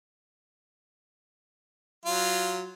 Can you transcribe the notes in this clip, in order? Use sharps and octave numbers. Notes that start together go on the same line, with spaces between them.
F#3 F4